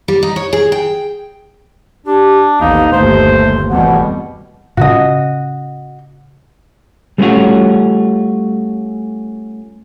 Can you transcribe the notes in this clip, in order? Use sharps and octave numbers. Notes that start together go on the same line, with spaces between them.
G3
D#4
C#5
G#4
G5
D4 G4
A1 D#2 B3 D#4 F5
G1 D#2 A3 C5
F1 E2 B2 G3 F#5
A2 C#3 C#4 F#4 D#5
G3 A3 B3 C#4 F4 F#4